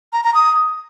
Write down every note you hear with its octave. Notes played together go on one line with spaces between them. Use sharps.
A#5
A#5
D#6